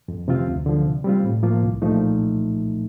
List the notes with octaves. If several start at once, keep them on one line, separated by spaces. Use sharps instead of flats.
F2
C3 F3 C4 F4
D2
D3 F3
C3
G3 C4 F4
A2
F3 A#3 F4
C2
A#2 F3 A3 D#4